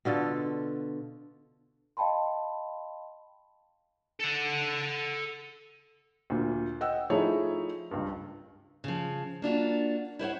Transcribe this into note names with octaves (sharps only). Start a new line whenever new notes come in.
B2 D3 F4 A4
D#5 F5 G5 A5 B5 C6
A4 F#5
D2 A#2
D#5 F#5 G5 E6
F3 A3 D#4 E4 G#4 C#5
C#2 G2
C#3 F3
A#3 D4 F4 F#4
E4 C5 C#5 F#5